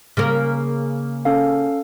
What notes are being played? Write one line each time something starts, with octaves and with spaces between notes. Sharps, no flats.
C#3 A#3 A#4
C#4 A4 F5